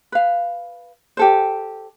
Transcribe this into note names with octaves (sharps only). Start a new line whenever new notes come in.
B4 F5
G4 A4 C5